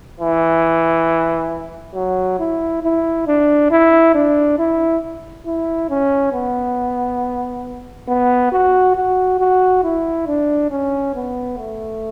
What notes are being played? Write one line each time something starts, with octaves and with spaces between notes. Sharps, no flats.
E3
F#3
E4
E4
D4
E4
D4
E4
E4
C#4
B3
B3
F#4
F#4
F#4
E4
D4
C#4
B3
A3